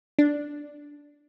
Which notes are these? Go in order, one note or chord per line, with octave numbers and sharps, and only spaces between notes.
D4